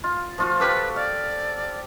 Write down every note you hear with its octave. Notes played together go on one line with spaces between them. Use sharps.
F4
F3 F4 F#4
F#4 G4 A4 B4
D5 F5